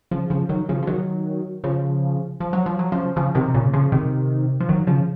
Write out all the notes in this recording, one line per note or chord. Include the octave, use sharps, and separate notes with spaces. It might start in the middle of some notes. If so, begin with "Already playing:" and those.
C#3 F3
C#3 F3
D#3 F#3
C#3 F3
F3
D#3 F#3
C#3 F3
F3
F#3
F3
F#3
C#3 F3
C#3 F3
C3 D#3
A#2 C#3
C#3 F3
C3 D#3
F3
D#3 F#3
C#3 F3